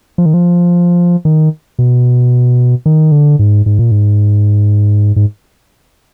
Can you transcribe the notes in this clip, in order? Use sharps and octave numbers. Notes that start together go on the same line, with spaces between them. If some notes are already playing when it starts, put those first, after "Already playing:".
F3
D#3
F3
D#3
B2
D#3
D3
G#2
G#2
A#2
G#2
G#2